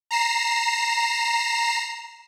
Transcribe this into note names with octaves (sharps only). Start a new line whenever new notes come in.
A#5 C7 E7